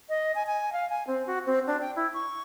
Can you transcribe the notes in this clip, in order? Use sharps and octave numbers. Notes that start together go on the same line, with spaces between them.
D#5
G#5
G#5
F5
G#5
C4
F#4
C4
D4
G5
E4
C#6